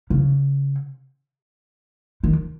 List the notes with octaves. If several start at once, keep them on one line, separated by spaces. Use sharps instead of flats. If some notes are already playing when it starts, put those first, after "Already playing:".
C#3
D#3